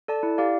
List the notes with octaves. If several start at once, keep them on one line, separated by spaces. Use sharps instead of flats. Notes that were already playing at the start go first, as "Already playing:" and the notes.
A4 D5 A5
E4
G4 D5 F5